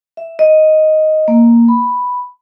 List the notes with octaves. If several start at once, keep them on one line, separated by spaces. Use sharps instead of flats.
E5
D#5
A#3
B5